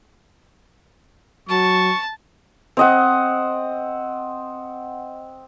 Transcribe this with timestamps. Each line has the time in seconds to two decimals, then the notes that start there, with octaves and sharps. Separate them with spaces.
1.49 F#3 A5 C#6
2.77 C4 D#5 F#5